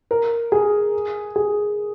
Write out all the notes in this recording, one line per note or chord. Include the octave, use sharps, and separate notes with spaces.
A#4
G#4
G#4